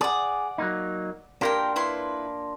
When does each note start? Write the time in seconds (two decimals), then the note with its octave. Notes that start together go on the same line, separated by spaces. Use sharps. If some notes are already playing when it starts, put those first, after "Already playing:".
0.01 G#4 D5 F#5
0.58 F#3 A#3 D#4
1.41 A#3 D4 F4 G4 A#4 G5
1.76 E4 B4 C6